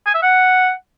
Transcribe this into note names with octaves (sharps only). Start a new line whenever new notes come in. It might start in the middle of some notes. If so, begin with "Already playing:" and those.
G#5
E5
F#5